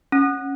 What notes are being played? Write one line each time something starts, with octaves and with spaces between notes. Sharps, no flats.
C#4